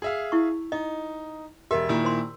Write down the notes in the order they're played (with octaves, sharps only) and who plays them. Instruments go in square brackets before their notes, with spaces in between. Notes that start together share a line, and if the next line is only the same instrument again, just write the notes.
[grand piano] G#4 E5 F5
[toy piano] E4 C#6
[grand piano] D#4 [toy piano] D#5
[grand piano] E1 E5 [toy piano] G4 A#4 D#5
[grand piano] A#2 D#3 E4
[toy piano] C5 C6